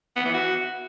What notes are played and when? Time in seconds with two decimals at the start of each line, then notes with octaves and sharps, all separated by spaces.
0.16 B3
0.25 E3
0.34 F#4